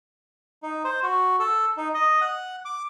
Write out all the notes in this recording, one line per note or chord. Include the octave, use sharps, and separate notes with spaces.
D#4
C5
F#4
A4
D#4
D#5
F#5
D6